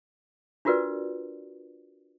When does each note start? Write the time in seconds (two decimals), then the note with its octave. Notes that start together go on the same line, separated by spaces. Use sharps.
0.65 D4 F4 F#4 A#4 B4 D5